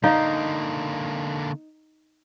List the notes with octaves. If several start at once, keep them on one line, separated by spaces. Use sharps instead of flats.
D3 A#3 D#4 D#5 F5